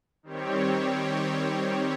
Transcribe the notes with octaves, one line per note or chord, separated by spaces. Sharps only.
D#3 G3 C4 G4 C#5